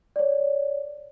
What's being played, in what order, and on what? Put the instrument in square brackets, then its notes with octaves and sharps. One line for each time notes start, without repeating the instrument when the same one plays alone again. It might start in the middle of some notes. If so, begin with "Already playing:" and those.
[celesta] C#5 D5